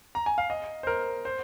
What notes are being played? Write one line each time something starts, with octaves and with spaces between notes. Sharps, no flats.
A#5
G#5
F5
D#5
C5
A#4
C5